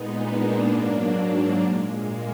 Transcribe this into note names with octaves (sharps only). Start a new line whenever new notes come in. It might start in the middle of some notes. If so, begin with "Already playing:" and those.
Already playing: A#2 G#3 B3 D#4
A#3 D4
G#2 F#3
A#2 G#3
A#3